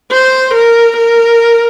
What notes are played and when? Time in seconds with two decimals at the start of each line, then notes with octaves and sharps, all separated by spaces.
0.11 C5
0.54 A#4
0.97 A#4